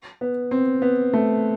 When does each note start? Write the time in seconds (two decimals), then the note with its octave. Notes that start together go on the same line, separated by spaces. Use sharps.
0.21 B3
0.51 C4
0.82 B3
1.14 A3